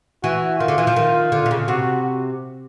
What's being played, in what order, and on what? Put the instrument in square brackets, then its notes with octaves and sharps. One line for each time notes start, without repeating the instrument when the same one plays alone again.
[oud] E3 [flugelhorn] F#4
[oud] D#3 [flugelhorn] F4
[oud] D3
E3
F3
D#3
D3
C3
C#3
[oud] C3 [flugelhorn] F#4